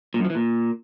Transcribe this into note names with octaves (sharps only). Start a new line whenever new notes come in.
A#2
F#2
F3
E3
A#2